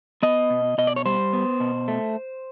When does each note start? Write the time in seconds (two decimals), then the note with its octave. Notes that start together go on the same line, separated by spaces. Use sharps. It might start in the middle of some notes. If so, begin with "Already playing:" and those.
0.23 B3 D#5
0.50 B2
0.78 B2 D#5
0.87 D5
0.96 C#5
1.05 G3 C5
1.33 B3
1.60 B2
1.88 A3